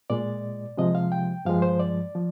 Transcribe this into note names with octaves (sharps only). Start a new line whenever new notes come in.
A#2 G#3 D5
C3 F3 G#3 D#5
F5
G5
G2 F3 G#3 F5
C5
D5
F3